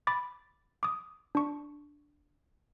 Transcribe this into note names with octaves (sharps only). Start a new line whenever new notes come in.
B5 D6 A6
D6 D#6
D4 C#6